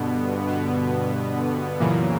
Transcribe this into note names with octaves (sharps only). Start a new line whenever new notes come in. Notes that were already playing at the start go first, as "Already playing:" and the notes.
Already playing: G2 B2 D3 B3
B2 B3
F#2 A#2 C#3 E3 A#3